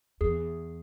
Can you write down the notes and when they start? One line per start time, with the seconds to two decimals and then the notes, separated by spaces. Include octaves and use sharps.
0.21 E2 G#4